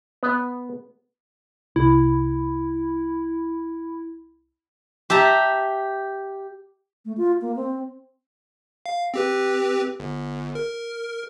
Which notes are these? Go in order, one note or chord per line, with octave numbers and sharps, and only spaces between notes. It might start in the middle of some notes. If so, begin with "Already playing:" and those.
B3
C2 E4
G4 E5 A5 A#5
A3
F4
A#3
C4
F5
C4 G4 B4
G1
A#4